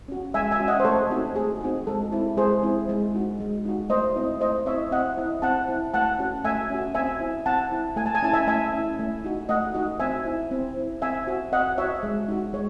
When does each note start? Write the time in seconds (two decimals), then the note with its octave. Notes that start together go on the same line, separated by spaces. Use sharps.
0.08 C#4 F#4
0.34 G#3 E5 G#5
0.51 E5 G#5
0.60 C#4 F#4
0.68 D#5 F#5
0.80 C5
0.85 A3 A4 C#5
1.10 C4 D#4 F#4
1.36 A3 G#4
1.61 C4 D#4 F#4
1.87 G#3 A4
2.12 C4 E4
2.37 G#3 G#4 C5
2.63 C4 E4
2.89 G#3
3.15 D#4 F#4
3.40 G#3
3.65 D#4 F#4
3.90 A3 C5 D#5
4.16 C4 E4
4.41 A3 C5 D#5
4.66 C4 E4 C#5 E5
4.91 C4 D#5 F#5
5.18 E4
5.42 C4 F#5 A5
5.69 E4
5.94 A3 F#5 A5
6.19 C#4 F#4
6.44 A3 E5 G#5
6.70 C#4 F#4
6.95 C4 E5 G#5
7.20 E4
7.46 C4 F#5 A5
7.71 E4
7.96 A3 G#5
8.06 A5
8.15 G#5
8.22 C#4 E4 A5
8.33 E5 G#5
8.47 A3 E5 G#5
8.73 C#4 E4
8.99 A3
9.25 D#4 F#4
9.49 A3 D#5 F#5
9.74 D#4 F#4
10.00 C4 E5 G#5
10.25 E4
10.51 C4
10.77 E4
11.02 C4 E5 G#5
11.27 F#4
11.52 C4 D#5 F#5
11.78 F#4 C#5 E5
12.03 G#3
12.28 D#4 F#4
12.54 G#3 C#5